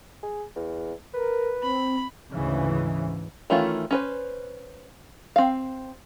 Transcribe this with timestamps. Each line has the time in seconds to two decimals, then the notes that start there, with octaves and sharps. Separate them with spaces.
0.23 G#4
0.56 E2
1.14 A#4 B4
1.63 C4 B5
2.31 D2 G#2 C#3 E3
3.50 D#3 E3 A3 C#4 F4
3.91 C#4 B4 C5
5.36 C4 F5